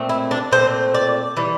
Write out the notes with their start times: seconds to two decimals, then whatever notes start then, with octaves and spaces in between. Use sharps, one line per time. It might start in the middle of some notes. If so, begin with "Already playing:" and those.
Already playing: A#2 A3 C4
0.09 E4
0.31 D4
0.51 A#2 A3 C4 C5
0.94 D5
1.37 E3 G3